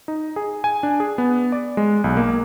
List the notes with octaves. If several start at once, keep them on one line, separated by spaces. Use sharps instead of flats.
D#4
G#4
G#5
D4
G#4
B3
D5
G#3
B1
A#3